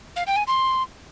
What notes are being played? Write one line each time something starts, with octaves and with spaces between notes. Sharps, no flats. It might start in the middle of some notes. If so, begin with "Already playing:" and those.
F5
G5
G#5
C6